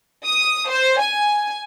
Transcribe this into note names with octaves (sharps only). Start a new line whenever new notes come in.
D#6
C5
G#5